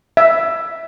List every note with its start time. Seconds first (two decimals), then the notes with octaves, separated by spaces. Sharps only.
0.17 E5